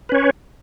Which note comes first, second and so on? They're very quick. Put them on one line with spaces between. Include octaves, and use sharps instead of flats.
B4 C#4 C#5